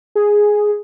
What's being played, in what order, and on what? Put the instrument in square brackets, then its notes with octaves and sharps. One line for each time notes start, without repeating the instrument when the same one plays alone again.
[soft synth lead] G#4